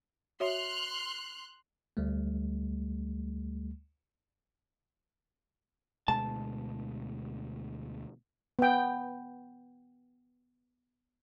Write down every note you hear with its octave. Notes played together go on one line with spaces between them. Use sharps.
F#4 C#5 E5 C6 F6 F#6
D2 G3 A3
D2 B2 G#3 A5
B3 G5